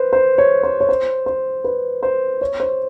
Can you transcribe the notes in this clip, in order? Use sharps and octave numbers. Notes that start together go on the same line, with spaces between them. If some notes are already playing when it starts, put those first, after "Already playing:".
Already playing: B4 C5
C5
C#5
C5
C#5
C5
C5
B4
C5
C#5
C5